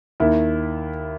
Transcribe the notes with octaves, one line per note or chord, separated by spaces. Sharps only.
D#2 D#3 E4